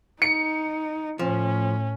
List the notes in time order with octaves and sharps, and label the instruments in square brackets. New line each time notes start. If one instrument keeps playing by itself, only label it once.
[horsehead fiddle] D#4 [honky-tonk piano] C#7
[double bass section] A2 [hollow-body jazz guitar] F3 [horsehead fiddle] C#4